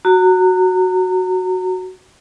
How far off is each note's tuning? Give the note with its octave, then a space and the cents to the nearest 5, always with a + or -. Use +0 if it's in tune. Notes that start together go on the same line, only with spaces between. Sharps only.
F#4 +0 A#5 -30